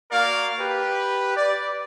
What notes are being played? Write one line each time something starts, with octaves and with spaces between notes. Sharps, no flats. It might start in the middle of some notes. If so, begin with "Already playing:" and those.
A#3 F#4 A#4 D5 F5
G4 B4
D5